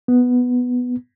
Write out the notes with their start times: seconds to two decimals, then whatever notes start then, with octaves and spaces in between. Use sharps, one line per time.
0.08 B3